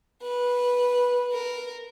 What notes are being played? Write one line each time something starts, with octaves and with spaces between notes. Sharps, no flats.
B4
A#4